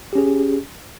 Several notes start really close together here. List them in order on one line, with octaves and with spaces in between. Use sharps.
G4 C#4 G#4